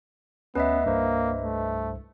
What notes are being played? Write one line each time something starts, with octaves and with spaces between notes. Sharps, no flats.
D2 B3 C#4 B4 D#5 E5
C2 G2 A#3 C5
A3